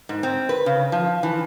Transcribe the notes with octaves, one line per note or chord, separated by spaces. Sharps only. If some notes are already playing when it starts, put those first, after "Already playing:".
G#2
C4
B4
C#3
F3
E3